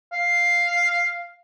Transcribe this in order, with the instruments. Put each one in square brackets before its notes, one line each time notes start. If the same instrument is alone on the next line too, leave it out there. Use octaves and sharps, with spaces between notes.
[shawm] F5